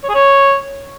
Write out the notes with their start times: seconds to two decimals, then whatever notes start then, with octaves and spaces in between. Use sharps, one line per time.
0.04 C#5
0.09 G#4
0.14 C#5